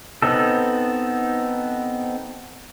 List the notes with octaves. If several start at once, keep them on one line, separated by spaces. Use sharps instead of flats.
B3 C4 D#4 A4